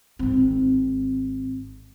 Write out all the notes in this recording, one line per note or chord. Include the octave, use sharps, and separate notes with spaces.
G#1 C4